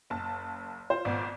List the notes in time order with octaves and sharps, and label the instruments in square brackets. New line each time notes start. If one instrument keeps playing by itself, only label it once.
[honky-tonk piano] F#1 A5
[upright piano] F4 C5
[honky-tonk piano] G#1 B3 D5